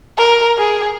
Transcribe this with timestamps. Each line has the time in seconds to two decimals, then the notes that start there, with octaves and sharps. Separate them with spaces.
0.18 A#4
0.58 G#4